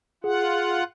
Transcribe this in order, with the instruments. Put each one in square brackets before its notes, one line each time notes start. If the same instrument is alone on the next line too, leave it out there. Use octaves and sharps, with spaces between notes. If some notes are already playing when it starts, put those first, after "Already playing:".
[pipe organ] F4 F#5 [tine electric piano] G#4